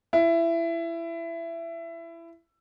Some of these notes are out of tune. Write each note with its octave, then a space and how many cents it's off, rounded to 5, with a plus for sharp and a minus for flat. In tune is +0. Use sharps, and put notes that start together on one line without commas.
E4 +20